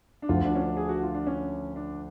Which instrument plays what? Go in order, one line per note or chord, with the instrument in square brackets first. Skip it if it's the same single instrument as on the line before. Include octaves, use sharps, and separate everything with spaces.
[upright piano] D4
[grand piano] D2 D3 F3 [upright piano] F4
[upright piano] D4
C#4
D4
G#4
F#4
F4
D4
C#4
D4